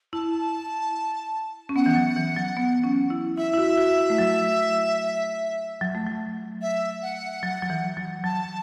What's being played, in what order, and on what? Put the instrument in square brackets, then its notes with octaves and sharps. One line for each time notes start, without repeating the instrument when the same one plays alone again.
[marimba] E4 [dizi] A5
[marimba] C#4
[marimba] B3 [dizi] F#5
[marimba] E3
F#3
E3
F#3
B3
C#4
E4
[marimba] E4 [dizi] E5
[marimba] E4
F#4
F#4
E4
A3
F#3
F#3
A3
F#3
[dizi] E5
F#5
[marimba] F#3
F#3
E3
F#3
[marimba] F#3 [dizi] A5